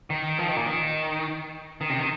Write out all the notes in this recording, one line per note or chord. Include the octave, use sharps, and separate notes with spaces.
D#3
F3
D#3
A#2
D#3
D#3
C3
D#3